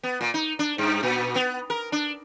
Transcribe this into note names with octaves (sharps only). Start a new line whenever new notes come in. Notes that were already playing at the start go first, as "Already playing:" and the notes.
B3
A#2
D#4
D4
G2
A#2
B3
A#4
D4